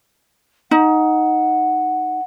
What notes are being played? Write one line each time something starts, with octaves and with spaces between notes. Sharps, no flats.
D#4 F#5